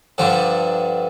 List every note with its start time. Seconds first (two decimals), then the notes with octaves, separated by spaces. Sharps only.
0.18 G2 D3 F3